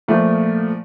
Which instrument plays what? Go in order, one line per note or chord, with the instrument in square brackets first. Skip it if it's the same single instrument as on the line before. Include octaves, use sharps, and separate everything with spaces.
[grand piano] A#2 F3 A3